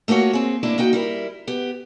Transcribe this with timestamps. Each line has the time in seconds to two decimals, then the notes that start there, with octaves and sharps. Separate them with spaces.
0.08 A3 A#3 F4 F#4 C#5
0.33 C4 G#4
0.63 D#2 A2 A#3 D4 E4 D5
0.78 A#3 D#4 F#4 G5
0.93 G3 E4 A#4
1.47 B3 G4